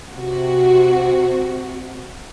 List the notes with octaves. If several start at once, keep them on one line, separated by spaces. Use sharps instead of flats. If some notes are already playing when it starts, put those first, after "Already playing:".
C3 F#4